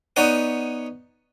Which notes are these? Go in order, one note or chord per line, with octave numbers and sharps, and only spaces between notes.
B3 D#4 C#5 D5 F#5 G#5